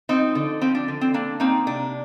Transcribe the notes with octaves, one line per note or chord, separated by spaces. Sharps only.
F3 C4 D#4
D3
F3 C4
D4
D3
C4
A#3 D4
A#3 C4 D#4
C3 D4